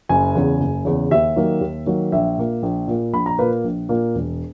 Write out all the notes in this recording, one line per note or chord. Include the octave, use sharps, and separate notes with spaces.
F#1 G#5
E2 C#3
F#1
E2 C#3
D#2 E5
D#3 F#3 A#3
D#2
D#3 F#3 A#3
A#1 E5
A#2 A#3
A#1
A#2 A#3
A#1 B5
A#5
A#2 A#3 B4
A#1
A#2 A#3
E1